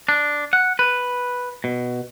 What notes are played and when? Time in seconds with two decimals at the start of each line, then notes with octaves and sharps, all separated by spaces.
0.09 D4
0.53 F#5
0.79 B4
1.64 B2